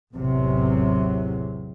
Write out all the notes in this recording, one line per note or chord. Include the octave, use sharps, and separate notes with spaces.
A1 E2 C3 F#3